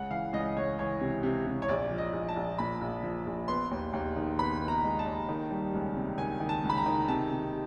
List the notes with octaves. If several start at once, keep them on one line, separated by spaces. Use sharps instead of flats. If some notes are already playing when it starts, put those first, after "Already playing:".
Already playing: C#2 F#5
E3 F5
C#2 D#5
C#2 C#5
E3 C#5
C3
C3
C3
C#5
A#1 D5
F3
D#5
A#1
A5
A#1
A#2 B5
A#1
F3
A#1
B3 C6
D#2
D#2
D#3
B3 B5
B3
A#5
G#3
A5
D#2
D#3
G3
C#2
C3
D#3 G#5
D#3
A5
C#2
B5
A#5
D#3
C3 A5
C3